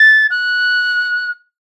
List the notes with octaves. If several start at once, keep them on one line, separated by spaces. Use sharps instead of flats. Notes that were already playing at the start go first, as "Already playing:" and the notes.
Already playing: A6
F#6